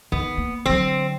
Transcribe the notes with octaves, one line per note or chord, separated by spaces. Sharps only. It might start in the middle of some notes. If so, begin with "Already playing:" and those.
D#3 B3
A#3
D3 F#3 C4